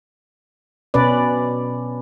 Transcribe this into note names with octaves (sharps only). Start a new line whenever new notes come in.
B2 C#4 B4 D5